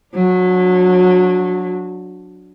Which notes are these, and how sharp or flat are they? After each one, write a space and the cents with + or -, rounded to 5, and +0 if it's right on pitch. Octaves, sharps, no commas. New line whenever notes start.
F#3 -20 D4 +0